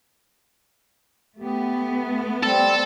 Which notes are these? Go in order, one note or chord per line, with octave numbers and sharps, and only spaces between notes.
A3 B3 G4
G3 C4 A4